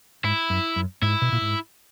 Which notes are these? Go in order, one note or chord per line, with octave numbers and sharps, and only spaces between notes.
G#2 E4
F#2
F#2
G#2 E4
B2
A#2
G#2